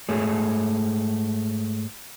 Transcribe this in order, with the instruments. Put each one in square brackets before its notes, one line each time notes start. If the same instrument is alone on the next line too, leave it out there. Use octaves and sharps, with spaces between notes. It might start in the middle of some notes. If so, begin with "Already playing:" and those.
[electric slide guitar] G#2 A3 G#4 C#5 G#5